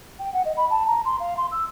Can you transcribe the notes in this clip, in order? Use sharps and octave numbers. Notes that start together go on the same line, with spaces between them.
G5
F#5
D#5
B5
A5
A#5
C6
F5
C6
E6